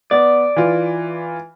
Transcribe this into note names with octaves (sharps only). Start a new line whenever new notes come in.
B3 D5
E3 F4